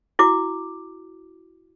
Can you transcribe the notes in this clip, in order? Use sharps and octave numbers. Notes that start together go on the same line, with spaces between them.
E4 F#4 D6